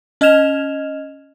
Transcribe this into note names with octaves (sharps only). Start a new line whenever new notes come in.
C#4 D#5 F6 G#6 E7 F7